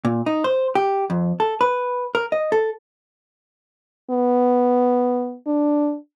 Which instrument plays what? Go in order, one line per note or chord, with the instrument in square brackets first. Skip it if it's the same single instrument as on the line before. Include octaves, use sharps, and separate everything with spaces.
[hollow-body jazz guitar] A#2
D#4
C5
G4
F2
A4
B4
A#4
D#5
A4
[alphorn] B3
D4